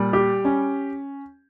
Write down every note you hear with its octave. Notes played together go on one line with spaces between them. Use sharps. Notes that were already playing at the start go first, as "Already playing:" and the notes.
Already playing: A#2 G3
G4
C#4